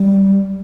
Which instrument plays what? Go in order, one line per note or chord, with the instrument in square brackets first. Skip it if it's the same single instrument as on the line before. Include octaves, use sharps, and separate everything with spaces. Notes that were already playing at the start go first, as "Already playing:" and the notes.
Already playing: [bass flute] G3